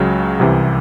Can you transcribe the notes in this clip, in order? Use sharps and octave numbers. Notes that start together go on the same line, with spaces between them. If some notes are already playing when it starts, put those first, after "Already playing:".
Already playing: C#2 C#3 F#3
C2 C3 E3